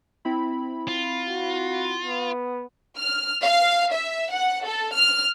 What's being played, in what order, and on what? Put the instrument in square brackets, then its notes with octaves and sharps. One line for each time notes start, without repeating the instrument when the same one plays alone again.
[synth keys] C4 E4 B5
[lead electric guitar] F4
[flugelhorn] F#4
B3
[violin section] F6
F5
E5
F#5
A4
F6